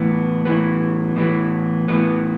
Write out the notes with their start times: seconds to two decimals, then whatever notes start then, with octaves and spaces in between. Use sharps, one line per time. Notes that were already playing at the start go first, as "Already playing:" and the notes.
Already playing: A2 E3 B3
0.45 A2 E3 B3
1.16 A2 E3 B3
1.88 A2 E3 B3